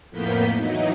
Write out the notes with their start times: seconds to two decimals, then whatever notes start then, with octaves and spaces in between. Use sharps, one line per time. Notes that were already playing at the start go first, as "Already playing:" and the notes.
0.10 F2 A2 A#3 B3 G6 B6
0.55 E3 F#3 D#4